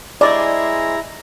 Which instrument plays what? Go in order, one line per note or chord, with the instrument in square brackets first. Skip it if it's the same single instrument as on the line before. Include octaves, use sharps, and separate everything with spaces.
[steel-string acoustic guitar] G#3 G#4 C5 [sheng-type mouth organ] E4 A#5 [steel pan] D5